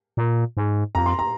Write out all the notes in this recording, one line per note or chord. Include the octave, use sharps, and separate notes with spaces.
A#2
G#2
F2 A#5
C6
A#5